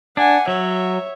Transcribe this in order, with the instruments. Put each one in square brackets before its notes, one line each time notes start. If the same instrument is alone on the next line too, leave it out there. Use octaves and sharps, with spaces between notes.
[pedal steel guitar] D4 [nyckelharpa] F#5 G#5
[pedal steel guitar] F#3 [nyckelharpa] C#5 E5